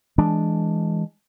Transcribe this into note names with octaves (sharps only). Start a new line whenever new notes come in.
E3 G#3 D4